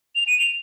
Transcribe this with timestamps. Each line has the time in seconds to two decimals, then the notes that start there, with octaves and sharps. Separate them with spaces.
0.16 F7
0.27 D#7
0.38 F7